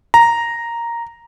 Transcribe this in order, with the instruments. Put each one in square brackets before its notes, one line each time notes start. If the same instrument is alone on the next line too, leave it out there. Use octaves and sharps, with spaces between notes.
[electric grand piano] A#5